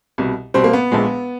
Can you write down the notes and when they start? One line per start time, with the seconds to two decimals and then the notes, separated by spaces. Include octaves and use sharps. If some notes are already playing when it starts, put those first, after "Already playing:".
0.18 C2 B2 G3
0.54 C2 B2 G3 C4
0.64 A#3
0.73 B3
0.91 A#1 A#2 F3 G#3